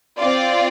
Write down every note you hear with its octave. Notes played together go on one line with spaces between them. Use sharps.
C4 F4 D5